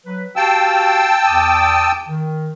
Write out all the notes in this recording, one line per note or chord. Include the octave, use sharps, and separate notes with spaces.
F#3 B4
F#4 G4 F5 G5 A5 E6
E2 D6 D#6
D#3